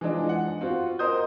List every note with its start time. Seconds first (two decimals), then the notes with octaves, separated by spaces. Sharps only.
0.01 E3 F3 G#3 D4 D#4
0.29 F#5
0.61 C4 F4 F#4
0.99 A#4 C5 D#5 D#6 G6